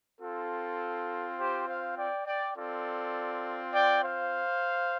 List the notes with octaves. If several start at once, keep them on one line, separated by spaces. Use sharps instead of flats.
C4 F4 A4
G4 C5
C5 F5
D5 G5
D5 G5
C4 F4 A4 D5
D5 G5
C5 F5